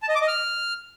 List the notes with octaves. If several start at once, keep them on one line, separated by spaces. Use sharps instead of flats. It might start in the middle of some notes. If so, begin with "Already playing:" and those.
A5
D#5
D6
D#5
F6